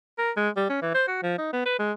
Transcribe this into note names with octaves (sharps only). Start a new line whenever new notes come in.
A#4
G#3
G3
C#4
E3
C5
F#4
F3
D#4
B3
B4
G#3